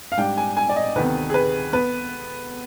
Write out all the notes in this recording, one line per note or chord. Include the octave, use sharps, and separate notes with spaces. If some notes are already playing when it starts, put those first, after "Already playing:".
F5
G#2 G3 D4 G5
G#5
G#5
D5
D#5
D2 C3 D#3 B3 B4
G#4
B4
B3 B4